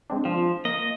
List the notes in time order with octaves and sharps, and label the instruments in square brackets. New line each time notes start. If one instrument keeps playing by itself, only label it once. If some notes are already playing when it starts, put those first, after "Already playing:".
[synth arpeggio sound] G#3 C4 D4
[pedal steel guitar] F3 [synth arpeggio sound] F4
[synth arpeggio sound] A#3 [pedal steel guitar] D#5